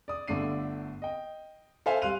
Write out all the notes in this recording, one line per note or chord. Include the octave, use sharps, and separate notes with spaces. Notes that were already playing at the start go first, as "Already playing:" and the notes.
D5 D#6
G1 D3 A3 D4 C7 D#7
D#5 G5
A4 C5 E5 F5 G#5
G3 F5 C6 F#6 D#7 F7